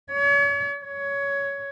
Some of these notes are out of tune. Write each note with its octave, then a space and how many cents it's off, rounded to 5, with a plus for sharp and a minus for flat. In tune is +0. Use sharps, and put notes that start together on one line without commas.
C#5 +40
C#5 +15